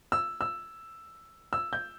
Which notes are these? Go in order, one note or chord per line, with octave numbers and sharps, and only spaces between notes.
E6
E6
E6
G6